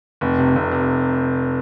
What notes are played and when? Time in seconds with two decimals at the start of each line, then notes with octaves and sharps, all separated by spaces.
0.21 F1
0.38 C3
0.55 F1
0.71 C3